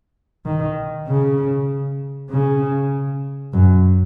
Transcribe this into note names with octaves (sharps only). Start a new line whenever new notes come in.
D#3
C#3
C#3
F#2